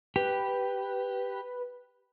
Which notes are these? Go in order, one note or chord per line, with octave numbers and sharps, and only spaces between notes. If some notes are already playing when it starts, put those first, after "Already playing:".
G4 B4